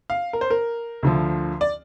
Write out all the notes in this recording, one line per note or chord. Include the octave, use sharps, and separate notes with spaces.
F5
A#4
C5
A#4
D2 D3 F3
D5